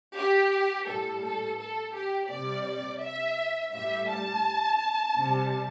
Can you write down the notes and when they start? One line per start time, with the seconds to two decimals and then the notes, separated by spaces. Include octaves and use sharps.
0.16 G4
0.87 A2 G3 A4
1.23 A4
1.60 A4
1.96 G4
2.30 C3 G3 D5
3.02 E5
3.74 A2 G3 E5
4.10 A5
5.18 C3 G3